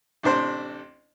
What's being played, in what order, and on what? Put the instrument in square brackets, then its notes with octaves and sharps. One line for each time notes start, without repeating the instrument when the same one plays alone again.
[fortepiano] A1 C3 D4 C5 C6